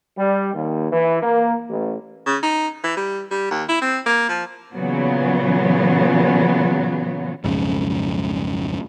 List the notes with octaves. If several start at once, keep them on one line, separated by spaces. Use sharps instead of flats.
G3
D#2
E3
A#3
A1
C#3
D#4
E3
G3
G3
D#2
E4
C4
A#3
F3
A#2 C#3 E3 F#3 B3
B1 F2 G#2 C#3